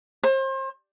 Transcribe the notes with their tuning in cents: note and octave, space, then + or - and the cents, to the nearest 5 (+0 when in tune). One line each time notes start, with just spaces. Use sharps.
C5 +35